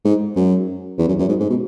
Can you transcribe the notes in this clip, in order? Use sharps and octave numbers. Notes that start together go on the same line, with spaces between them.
G#2
F#2
E2
F#2
F#2
G#2
G#2
B2